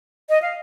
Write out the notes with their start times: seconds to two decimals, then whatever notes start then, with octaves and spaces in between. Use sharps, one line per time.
0.29 D#5
0.42 F5